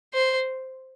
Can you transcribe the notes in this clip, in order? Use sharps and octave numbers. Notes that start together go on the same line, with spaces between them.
C5